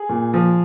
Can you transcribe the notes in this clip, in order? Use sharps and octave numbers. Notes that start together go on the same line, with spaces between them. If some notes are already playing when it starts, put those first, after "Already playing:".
Already playing: G#4
A#2
F3